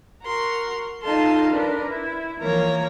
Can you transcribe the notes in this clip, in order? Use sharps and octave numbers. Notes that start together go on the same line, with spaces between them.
F#4 A#4 C6
D#4 F4 A4 F5 A5 C6
D4 A#4 B4
E4
E3 F3 A#3 A#4 C#5